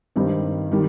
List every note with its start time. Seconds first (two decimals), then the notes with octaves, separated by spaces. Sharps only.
0.16 G2 D#3 G3 C4 D#4
0.72 D#3 G3